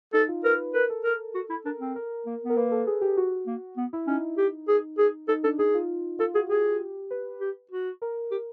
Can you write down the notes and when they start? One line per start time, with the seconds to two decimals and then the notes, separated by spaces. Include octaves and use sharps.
0.13 D#4 A4
0.28 F4
0.44 A#4 B4
0.74 A#4 B4
0.89 A4
1.04 A#4
1.35 F#4
1.50 E4
1.65 D4 A#4
1.80 C4
1.96 A#4
2.26 A#3
2.44 B3
2.50 A#4
2.56 A#3 B4
2.71 A4
2.87 G#4
3.01 G4
3.17 F#4
3.47 A#3
3.77 B3
3.93 E4
4.07 C#4 D#4
4.38 G4
4.68 G#4
4.98 G#4
5.28 D#4 A4
5.44 D4 A4
5.59 D#4 G#4
5.74 F4
6.19 F4 A4
6.35 F#4 G#4
6.49 G4 G#4
7.11 B4
7.41 G4
7.71 F#4
8.02 A#4
8.31 G4